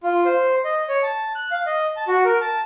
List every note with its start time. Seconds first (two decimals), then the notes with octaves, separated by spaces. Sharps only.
0.03 F4
0.25 C5
0.64 D#5
0.88 C#5
1.03 A5
1.35 F#6
1.51 F5
1.66 D#5
1.96 A5
2.08 F#4
2.24 A#4
2.41 A5